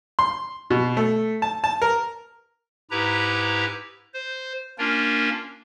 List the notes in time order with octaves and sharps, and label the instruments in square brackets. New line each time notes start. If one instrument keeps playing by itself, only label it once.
[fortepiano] C6
B2
A3
A5
A5
A#4
[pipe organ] G#2 E4 G4 B4 A#5
C5
A#3 C#4 D4 F4 A#4